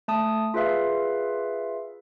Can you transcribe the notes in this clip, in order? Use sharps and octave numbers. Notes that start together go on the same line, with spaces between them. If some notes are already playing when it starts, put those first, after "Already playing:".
A3 A5 D#6
F4 G#4 B4 E5 F5